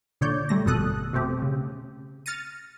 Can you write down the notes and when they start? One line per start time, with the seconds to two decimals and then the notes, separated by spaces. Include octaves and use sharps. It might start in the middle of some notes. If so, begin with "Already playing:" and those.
0.21 A#2 D3 C#5 D5 G6
0.49 G3 A3 A#6
0.66 G#1 F2 B2 A4 D#6 F#6
1.13 B2 A3 C4 G4
1.42 C#3
2.26 F6 A6 A#6 C#7 D#7